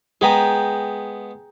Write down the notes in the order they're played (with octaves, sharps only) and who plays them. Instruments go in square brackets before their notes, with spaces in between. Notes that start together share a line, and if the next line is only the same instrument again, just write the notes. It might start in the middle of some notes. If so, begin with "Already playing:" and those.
[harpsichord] G#3 B3 B5 [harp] G#4 G5 A#5